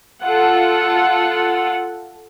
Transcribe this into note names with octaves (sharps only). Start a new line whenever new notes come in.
F4 A4 F#5